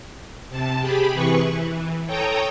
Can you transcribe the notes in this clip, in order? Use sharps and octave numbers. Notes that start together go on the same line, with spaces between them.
C3 A5
G4 G#4 B5
C3 E3 G#4 B4 C#6
E3
A4 C#5 G5 A#5 D#6